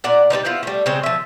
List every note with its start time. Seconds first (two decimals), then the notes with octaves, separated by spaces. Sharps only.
0.04 A#2 D5 F#5
0.30 G3 C4 D4 D#4
0.45 B3 C4 E4 F4
0.63 G3 A3
0.86 C#3 G#3 C4 C5
1.03 F3 E5